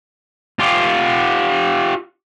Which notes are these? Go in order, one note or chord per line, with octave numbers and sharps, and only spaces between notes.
F4 G4